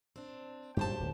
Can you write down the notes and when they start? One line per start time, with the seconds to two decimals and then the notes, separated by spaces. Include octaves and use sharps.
0.16 C4 D4
0.77 G2 A#2 C#3 G4 C5 A5
1.00 D1